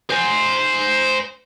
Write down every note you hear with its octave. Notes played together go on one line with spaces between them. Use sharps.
C5 G#5